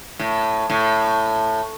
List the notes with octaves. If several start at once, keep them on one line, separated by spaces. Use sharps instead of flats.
A2
A2